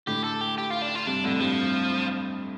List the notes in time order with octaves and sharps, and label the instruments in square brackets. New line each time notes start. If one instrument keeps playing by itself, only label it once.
[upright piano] A2 D3 [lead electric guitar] G4
[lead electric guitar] A4
G4
G4
F4
D4
F4
[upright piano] G2 C3 [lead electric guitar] D4
[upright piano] F2 A2 [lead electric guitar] D3
[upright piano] G2 C3 [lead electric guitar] F3